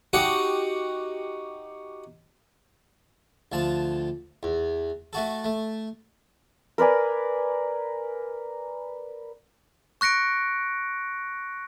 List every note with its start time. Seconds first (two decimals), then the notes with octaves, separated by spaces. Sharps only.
0.13 D#4 F#4 G4 F#5
3.52 D2 F3 A5
4.43 E2
5.13 A3 F#4 A4
5.44 A3
6.78 A#4 B4 D5 G#5
10.01 C#6 F#6 A#6 C#7 D7